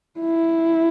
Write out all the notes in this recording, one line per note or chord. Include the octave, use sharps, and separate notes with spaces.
E4